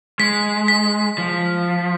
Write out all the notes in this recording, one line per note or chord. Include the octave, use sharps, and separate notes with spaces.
G#3 B6
B6
F3